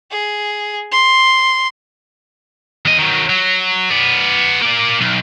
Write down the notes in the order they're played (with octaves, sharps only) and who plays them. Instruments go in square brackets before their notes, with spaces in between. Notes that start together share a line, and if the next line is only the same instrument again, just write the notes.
[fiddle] G#4
C6
[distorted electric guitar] E2 D#5
D#3 F#3
F#3
B3 D5
A#3 D5
B1